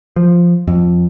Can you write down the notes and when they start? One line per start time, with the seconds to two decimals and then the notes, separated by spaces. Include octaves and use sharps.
0.16 F3
0.67 F2